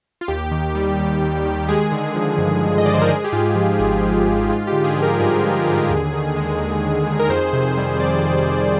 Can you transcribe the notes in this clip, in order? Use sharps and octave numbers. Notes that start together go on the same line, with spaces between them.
F4
D#2 G4
D#3
G3
D#2
D#2
D#3
G#3 G#4
D3
F3
G2
G#3
D#5
D3 D5
C5
A#4
G#3 G#4
G4
G#2 F4
F3
G#1 G#4
G#3
G#2
G#3 F4
D3 G4
G#4
F3
A#4
G2 G#4
G#3
D3
D#2
D#3
G#3
D#2
D#2
D#3
A#4
F2 C5
C3
G3
F2 D5
F2
C3